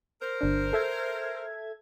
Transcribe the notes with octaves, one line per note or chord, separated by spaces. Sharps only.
A#4 C5
G1 D4
A4 E5 G#6